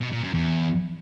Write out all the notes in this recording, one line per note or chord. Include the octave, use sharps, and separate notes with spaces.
B2
A#2
F#2
E2